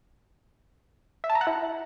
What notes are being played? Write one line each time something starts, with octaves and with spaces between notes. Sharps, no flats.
E5
A5
A#5
F#5
E4